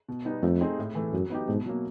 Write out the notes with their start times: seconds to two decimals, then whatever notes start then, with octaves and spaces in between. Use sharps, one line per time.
0.08 B2
0.25 G3 B3 D#4
0.43 F2 A3
0.61 C4 D#4 G#4
0.79 A2
0.95 E3 A3
1.13 F#2 F#3
1.30 B3 D#4 G4
1.47 G#2 B2
1.66 F#3 A#3